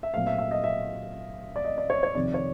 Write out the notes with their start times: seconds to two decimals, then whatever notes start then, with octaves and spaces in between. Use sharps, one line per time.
0.03 E5
0.14 A#2 F#3 A3 C4 F5
0.27 E5
0.39 E5
0.51 D#5
0.64 E5
1.56 D5
1.65 D#5
1.78 D5
1.90 C#5
2.03 C#5
2.15 F2 C3 D#3 D5
2.34 C#5